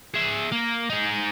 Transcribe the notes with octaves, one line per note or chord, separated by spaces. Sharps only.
G#4 E5
A#3
D#4 G#4